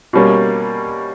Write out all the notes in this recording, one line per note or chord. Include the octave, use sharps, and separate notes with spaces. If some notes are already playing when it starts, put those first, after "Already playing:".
B2 G3 A#3 C#4